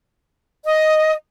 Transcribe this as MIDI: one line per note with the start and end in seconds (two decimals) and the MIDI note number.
0.65 1.15 75